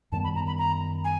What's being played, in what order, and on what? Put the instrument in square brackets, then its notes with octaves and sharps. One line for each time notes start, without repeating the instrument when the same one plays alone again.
[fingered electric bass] F#2 D#3 G3 B3 [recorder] A5
[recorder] B5
A#5
B5
A#5
G#5